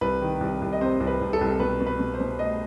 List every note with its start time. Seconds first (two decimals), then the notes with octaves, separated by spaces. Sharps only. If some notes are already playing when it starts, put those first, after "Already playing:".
0.01 C2 B4
0.22 D#3
0.41 C2
0.62 C2
0.73 D#5
0.81 C3 C5
1.00 C2
1.07 B4
1.21 C2
1.33 A4
1.41 C2
1.60 B2 B4
1.81 B2
1.86 B4
1.99 B2
2.14 C5
2.20 B2
2.39 A3 D#5